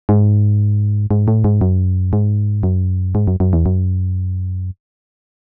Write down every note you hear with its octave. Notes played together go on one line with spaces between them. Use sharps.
G#2
G#2
A2
G#2
F#2
G#2
F#2
G#2
F#2
F#2
E2
F#2